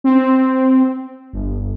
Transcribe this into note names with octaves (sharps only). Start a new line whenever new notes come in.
C4
G1